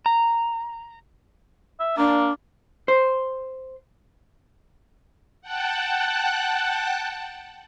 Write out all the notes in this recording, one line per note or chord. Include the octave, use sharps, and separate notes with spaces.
A#5
E5
A#3 D4
C5
F#5 G5 A5 F#6